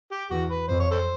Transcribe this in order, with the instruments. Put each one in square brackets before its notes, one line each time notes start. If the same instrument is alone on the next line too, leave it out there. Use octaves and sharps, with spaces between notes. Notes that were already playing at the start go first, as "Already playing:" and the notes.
[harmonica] G4
[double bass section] E2 [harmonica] F#4
[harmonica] B4
[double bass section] F2 [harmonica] C5
[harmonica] C#5
A4 C5